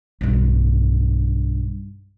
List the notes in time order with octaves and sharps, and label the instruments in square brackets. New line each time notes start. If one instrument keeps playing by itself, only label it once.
[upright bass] B1 G2